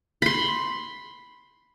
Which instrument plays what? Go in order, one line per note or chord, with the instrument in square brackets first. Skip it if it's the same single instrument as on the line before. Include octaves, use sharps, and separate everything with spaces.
[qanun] B5 C6